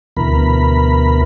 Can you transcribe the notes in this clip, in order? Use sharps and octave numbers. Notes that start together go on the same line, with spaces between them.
D2 B2 E3 A#4 B5